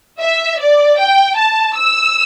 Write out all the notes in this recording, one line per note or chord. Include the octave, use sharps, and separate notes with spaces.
E5
D5
G5
A5
E6